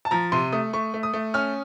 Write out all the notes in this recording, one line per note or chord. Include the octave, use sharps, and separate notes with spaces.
A5
F3 A#5
C3 C6
A3 D#6
A3 C#6
A3
D#6
A3
C#4 F6